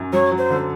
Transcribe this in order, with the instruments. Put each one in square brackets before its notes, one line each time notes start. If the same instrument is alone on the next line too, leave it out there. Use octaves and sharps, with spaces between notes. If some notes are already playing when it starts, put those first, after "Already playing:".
Already playing: [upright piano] F#2
[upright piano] F#3 [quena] C#5
[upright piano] F#3
[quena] C5
[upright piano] D3